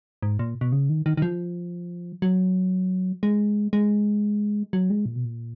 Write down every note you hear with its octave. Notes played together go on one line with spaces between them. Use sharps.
G#2
A#2
B2
C#3
D#3
D#3
D#3
F3
F#3
G#3
G#3
F#3
G#3
A#2
B2
A#2